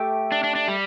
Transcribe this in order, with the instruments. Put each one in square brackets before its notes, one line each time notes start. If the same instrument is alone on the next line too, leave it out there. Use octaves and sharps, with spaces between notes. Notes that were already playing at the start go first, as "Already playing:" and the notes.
Already playing: [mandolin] A3 G4 E5
[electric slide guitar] D4
D4
D4
G3